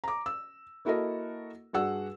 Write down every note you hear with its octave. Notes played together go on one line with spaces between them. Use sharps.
A#5 D6
E6
A#3 E4 F#4 A4 A#4 D#5
G2 D4 F#4 G#4 F#5 E6